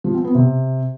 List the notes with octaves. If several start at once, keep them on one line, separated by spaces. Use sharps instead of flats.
F3
C4
B3
C3